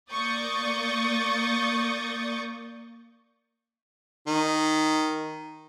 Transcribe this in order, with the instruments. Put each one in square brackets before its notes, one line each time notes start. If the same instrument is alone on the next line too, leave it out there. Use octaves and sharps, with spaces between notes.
[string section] A#3 D5 C#6 D#6 G6 A6
[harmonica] D#3